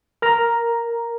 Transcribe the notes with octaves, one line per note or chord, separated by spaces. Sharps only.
A#4 A#5